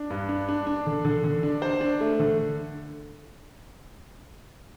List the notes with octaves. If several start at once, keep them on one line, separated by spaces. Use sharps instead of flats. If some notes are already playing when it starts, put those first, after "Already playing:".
Already playing: D4
G2
D4
D4
D4
D3
D3
D3
D4
C5
D4
A3
D3